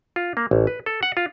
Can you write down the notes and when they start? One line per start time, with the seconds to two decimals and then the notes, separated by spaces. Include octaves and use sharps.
0.16 F4
0.37 A#3
0.51 A1
0.67 B4
0.86 A4
1.03 F#5
1.17 F4